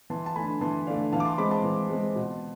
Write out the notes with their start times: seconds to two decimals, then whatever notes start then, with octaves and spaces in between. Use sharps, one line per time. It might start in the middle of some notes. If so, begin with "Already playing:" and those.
0.10 E3 A5 C6
0.26 A5
0.36 A3 D4 G#5 B5
0.61 E3 A5 C6
0.87 A3 D4 D5 F5
1.12 E3 F5 A5
1.20 D6
1.25 A5 C6
1.38 G#3 C4 B5 D6
1.51 A5 C6
1.64 E3
1.90 G#3 C4
2.15 B2